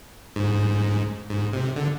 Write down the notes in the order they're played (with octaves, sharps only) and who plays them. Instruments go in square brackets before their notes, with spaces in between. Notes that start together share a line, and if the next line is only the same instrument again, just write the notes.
[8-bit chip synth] G#2
G#2
C3
D3